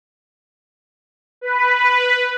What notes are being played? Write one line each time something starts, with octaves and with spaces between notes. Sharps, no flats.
B4